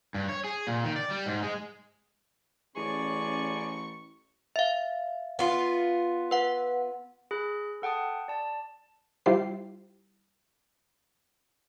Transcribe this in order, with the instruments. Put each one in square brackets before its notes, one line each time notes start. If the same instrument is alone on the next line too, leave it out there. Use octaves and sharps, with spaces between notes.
[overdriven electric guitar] G2
C#5
G#4
A#2
D#3
D5
G3
G#2
G#3
[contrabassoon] A1 [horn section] C#4 G#4 D5 [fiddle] C#6
[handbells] E5 F5
[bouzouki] B3 F4
[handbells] B4 F#5
G#4 B5 F#6
A4 F#5 G5 A5 D#6
D5 A5
[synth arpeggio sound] G3 E4 F4 G4 C5 C7